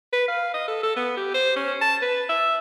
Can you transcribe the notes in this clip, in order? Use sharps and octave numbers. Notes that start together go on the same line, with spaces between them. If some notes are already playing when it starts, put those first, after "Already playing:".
B4
F5
D#5
A4
A4
B3
G4
C5
C#4
A5
B4
E5